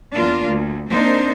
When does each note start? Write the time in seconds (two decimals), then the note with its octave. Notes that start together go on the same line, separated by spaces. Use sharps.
0.14 E2 A#3 D4 F4
0.47 D2
0.88 A#3 C4 D4 D#4 C5